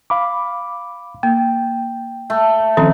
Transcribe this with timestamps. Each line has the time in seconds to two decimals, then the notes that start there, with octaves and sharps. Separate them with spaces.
0.10 F5 B5 D6
1.23 A#3 G5
2.30 A3
2.77 D#3 F3 C4 C#4 A4 A#5